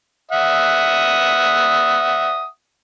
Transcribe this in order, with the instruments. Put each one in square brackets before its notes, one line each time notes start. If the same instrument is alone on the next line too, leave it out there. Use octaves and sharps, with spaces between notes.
[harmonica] E5 F#5 D#6